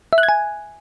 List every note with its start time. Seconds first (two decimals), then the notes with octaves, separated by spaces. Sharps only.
0.13 E5
0.18 F#6
0.23 G#6
0.29 G#5